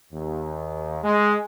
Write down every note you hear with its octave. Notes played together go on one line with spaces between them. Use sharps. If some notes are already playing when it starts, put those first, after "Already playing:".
D#2
G#3